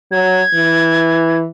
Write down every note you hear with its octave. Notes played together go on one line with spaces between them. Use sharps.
F#3 G#6
E3